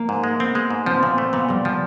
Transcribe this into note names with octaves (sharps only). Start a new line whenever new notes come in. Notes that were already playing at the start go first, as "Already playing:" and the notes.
Already playing: A#3
G#2
G#3
B3 C4
G#3
G#2
F3 C4
B3
A#2 C4
A3
A#2 B3
A#2 G3
F3 G3